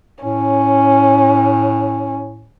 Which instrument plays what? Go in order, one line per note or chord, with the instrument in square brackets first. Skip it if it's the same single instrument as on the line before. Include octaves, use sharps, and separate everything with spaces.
[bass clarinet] A2 [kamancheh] C#4